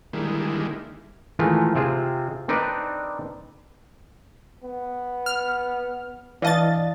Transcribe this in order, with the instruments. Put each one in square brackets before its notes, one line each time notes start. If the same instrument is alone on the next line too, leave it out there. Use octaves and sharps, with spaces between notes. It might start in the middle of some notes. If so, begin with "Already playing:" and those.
[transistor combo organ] D3 D#3 G3 G#3 A#3 E4
[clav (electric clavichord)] D#3 E3 G#3 A3 F4
C3 C4 F4 G#4
C4 D4 D#4 A#4 B4 D5
[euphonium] B3
[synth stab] F6
[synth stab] E3 D#5 A6 [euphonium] D4 [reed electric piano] D5 F5 A5